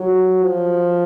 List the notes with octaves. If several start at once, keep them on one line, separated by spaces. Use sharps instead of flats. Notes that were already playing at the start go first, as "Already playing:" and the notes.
Already playing: F#3
F3